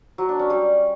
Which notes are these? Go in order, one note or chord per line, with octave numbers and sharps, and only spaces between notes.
F#3
D4
C#4
G3